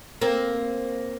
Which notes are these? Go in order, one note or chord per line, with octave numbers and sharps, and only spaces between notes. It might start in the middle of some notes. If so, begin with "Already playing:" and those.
A#3 C4